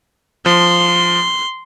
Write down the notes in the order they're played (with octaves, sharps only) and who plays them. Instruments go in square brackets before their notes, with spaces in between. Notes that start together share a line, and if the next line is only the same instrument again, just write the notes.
[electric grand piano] F3 [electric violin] C6